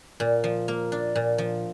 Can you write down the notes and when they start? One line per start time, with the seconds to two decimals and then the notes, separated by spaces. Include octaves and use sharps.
0.20 A#2
0.44 F3
0.68 A#3
0.92 D4
1.15 A#2
1.38 F3